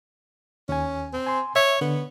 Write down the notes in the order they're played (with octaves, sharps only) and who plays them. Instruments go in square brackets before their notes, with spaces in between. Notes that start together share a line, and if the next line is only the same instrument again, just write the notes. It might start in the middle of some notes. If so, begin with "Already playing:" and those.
[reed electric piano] D#2 G#5 [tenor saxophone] C#4
[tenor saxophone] C4
[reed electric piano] G#5 C6
[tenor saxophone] C#5 [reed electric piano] E5
[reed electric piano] D3 [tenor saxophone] B3